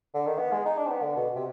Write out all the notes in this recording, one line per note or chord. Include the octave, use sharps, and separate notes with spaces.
D3
D#3
B3
G#3
D#4
D4
C4
B3
D3
B2
C3